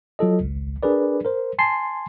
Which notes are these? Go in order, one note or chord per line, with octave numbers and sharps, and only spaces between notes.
F#3 F4 A4 D#5
G#1 C#2
D4 G#4 A#4 B4 D5
A#4 C5
G#5 A5 C6 C7